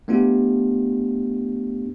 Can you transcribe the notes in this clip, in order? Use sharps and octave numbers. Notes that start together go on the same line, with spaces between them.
A3 B3 D4 F4 G4